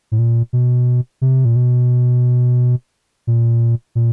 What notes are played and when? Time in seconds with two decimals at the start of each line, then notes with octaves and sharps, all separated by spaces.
0.12 A2
0.19 A#2
0.53 B2
1.21 C3
1.45 A#2
1.56 B2
3.27 A#2
3.95 A#2